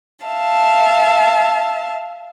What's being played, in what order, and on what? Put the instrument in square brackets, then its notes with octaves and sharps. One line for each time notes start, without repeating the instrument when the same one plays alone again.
[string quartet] E5 F5 A5